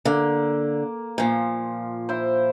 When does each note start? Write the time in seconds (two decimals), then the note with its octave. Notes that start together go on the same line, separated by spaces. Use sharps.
0.05 D3 A#3
1.18 A#2 F3
2.09 E4 C5